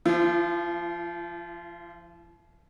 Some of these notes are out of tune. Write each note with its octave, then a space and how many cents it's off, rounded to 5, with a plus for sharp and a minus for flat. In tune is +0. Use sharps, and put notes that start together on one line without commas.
F3 -25 E4 +45